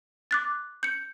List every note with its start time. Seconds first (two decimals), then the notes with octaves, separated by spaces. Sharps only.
0.31 D6 F#6 A6
0.83 G6 C#7